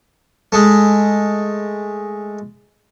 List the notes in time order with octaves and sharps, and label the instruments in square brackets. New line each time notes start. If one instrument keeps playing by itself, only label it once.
[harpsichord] G#3 A3